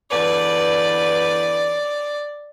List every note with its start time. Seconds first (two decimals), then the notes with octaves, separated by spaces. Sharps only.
0.11 E2 D3 B4 D5